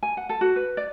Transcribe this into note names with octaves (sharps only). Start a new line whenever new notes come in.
G#5
F#5
A4
F#4
B4
D5